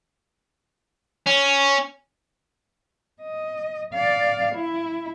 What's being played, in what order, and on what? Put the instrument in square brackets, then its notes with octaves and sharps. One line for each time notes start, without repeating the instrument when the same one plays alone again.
[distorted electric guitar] C#4
[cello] D#5
D5 F5
E4